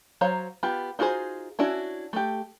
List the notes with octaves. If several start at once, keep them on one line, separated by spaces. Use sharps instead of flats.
F#3 C5 C#5 F5 A#5
B3 F4 G4
D#4 F4 F#4 G#4 C5
C#4 D4 E4 F#4
A3 G4